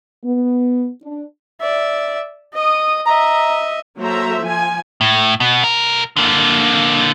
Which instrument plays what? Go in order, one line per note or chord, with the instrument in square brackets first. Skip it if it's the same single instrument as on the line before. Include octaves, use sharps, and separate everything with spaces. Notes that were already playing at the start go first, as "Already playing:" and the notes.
[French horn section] B3
D4
[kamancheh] D5 E5
D#5 D#6
[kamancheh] D#5 E5 [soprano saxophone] A#5
[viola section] F#3 A#3 A4 C5 E5 A#5
F3 G#5
[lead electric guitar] A2
B2
B1 A#4
D3 A#3